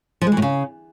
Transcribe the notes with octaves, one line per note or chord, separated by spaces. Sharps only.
F3
G#3
E3
A2
C#3